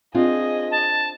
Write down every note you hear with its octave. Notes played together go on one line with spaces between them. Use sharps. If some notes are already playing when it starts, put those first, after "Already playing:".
C4 D4 F4 G#4 D#5
A5